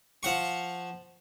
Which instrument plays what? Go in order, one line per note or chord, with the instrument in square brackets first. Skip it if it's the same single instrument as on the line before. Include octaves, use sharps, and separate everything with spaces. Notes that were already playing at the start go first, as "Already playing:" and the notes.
[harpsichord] F3 F#5 C#6